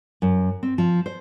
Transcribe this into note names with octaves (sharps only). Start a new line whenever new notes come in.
F#2
C4
F3
C5